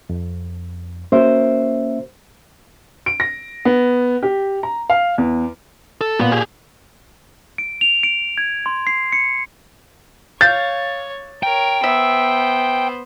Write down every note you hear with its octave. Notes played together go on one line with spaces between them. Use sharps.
F2
A#3 C#4 F#4 A#4 C5 E5
D7
A#6
B3
G4
A#5
F5
E2
A4
A#2 B3
G4 G#4
D7
F7
D7
G#6
C6
C7
C#7
C#5 F5 G6 A6
A#4 C#5 G5
B3 C5 E5